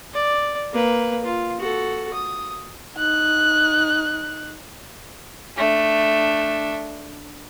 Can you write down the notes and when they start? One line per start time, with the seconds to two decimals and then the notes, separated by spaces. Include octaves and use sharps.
0.14 D5
0.73 A#3 B4
1.25 F4
1.60 F#4 A4
2.14 D#6
2.98 D#4 F#6
5.57 A3 D4